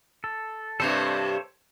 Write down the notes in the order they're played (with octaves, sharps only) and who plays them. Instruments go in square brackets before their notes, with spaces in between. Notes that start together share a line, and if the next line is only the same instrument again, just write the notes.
[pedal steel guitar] A4
[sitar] G2 C3 G3 [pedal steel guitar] A4 C5 C#5